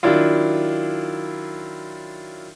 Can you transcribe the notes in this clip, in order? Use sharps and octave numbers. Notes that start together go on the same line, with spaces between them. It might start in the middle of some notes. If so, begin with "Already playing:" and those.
D#3 F#3 D4 E4 F4